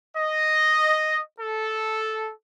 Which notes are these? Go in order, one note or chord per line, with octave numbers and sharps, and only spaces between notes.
D#5
A4